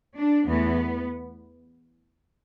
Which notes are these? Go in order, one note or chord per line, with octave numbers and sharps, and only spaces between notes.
D4
E2 E3 A3 B3